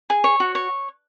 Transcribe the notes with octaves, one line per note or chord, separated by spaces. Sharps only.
G#4
C#5
F#4
C#5